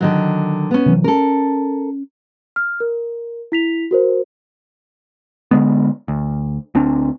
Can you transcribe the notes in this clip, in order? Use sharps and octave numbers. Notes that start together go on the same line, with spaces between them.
D3 D#3 F#3
B3 C#4
C3 E3 F#3
C#4 A4 A#4
F6
A#4
E4 B6 F7
F#4 A#4 C5
D3 F#3 G#3 B3
D2
D2 C4 D4